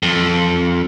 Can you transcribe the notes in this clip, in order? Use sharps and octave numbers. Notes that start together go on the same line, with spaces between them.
F2